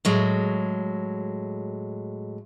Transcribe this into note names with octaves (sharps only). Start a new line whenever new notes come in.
A2 F#3 G#3